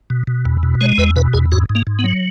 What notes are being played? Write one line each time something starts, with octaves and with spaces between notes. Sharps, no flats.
B2
B2
E2
B2
G#3 C#5
E2 B4
B2 B4
E2 G#4
G#2 F#4
G#2
A#3
G#2
B3
F#3